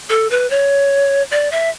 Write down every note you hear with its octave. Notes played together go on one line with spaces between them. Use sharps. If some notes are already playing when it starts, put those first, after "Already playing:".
A4
B4
C#5
D5
E5